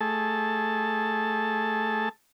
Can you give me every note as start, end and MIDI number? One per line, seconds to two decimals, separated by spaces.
0.01 2.09 57
0.01 2.09 68
0.01 2.09 69
0.01 2.09 81